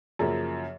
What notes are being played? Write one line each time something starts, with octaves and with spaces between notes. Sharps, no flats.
F#2 C#3 F3 A#3